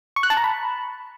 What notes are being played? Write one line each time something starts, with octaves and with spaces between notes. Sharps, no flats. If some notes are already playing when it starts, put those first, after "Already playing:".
C#6
F#6
A5
A#5
B5